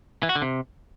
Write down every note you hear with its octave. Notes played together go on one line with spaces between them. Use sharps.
E3
F#4
D3
C3